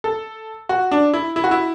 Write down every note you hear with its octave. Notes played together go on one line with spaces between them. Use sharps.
A4
F#4
D4
E4
E4
F#4
E4